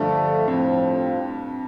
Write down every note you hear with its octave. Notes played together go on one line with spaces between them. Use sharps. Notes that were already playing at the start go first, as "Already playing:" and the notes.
Already playing: G2 D3 F3 A3 D4
F2 A2 F3 C4